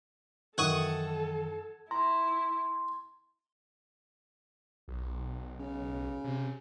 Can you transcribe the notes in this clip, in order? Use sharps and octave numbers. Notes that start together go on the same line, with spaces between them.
F#2 D#3 E3 A4 F#5 C#6 D#6 G#6
E4 A#5 C6
B1
C#3
C3